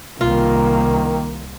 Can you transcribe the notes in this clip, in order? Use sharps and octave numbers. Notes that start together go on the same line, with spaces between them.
C2 D#3 A#3 F4